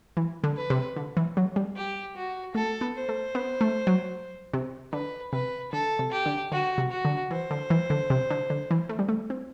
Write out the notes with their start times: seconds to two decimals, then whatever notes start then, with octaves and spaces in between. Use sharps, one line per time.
0.17 E3
0.44 D3
0.57 B4
0.70 C3
0.96 D3
1.17 E3
1.37 F#3
1.56 G3
1.76 G4
2.16 F#4
2.55 A3 A4
2.81 B3
2.95 C5
3.09 A3
3.35 B3
3.61 A3
3.87 F#3
4.54 C3
4.93 D3 B4
5.33 C3 B4
5.72 D3 A4
5.99 C3
6.12 G4
6.26 D3
6.52 D3 F#4
6.78 C3
6.92 F#4
7.05 D3
7.31 E3 C5
7.51 D3
7.70 E3
7.90 D3
8.10 C3
8.30 D3
8.50 D3
8.71 E3
8.89 A3
8.99 G3
9.09 A3
9.30 C4